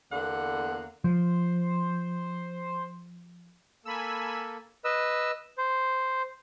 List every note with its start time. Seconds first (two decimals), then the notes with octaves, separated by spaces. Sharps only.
0.12 E2 D3 A#3 B3 F#5
1.04 F3 C5
3.85 A#3 A4 G#5 B5 E6
4.85 B4 D#5 E6
5.58 C5